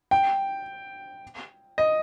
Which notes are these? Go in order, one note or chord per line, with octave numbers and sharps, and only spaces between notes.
G5
D#5